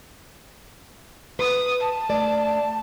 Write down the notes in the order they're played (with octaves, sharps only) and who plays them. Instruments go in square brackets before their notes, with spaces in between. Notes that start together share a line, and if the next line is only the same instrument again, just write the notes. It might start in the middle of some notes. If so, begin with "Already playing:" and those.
[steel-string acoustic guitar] B4 [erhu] D#6
[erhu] A5
[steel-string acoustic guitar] A3 D5